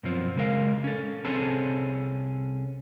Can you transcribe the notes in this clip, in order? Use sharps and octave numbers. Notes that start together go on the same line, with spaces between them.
F#2 B2 F3 C4
C#3 G#3 A#4 F5
C#4 A4
C2 C4 C#4 G#4 A4 A5